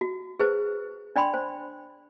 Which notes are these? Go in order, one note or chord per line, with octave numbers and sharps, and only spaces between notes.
F#4
G#4 B4 C5
D4 D5 G5 B5 C6
C5